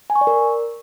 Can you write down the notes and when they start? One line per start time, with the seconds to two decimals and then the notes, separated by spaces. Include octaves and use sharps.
0.10 G#5
0.16 C#6
0.21 D5
0.27 A#4